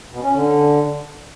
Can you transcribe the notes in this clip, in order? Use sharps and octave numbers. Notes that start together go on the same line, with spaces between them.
B2
C#4
D3